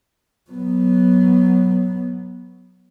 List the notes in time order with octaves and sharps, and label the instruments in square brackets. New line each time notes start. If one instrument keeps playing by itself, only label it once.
[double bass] F#3 B3